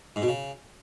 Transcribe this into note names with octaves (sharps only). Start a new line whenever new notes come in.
G#2
B2
C#3